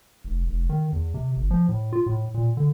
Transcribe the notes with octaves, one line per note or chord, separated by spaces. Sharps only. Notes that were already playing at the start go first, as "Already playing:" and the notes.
F1
F1
D#3
E2
C3
G1
F3
A2
F4
A2
A#2
D3